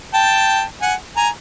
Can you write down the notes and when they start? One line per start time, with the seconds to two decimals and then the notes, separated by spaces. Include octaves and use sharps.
0.14 G5 A5
0.82 F#5 G#5
1.17 G#5 A#5